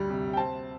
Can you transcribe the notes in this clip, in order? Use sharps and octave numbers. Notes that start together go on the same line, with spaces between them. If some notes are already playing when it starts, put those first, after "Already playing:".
Already playing: D2 G3
C3
G5
C4 A5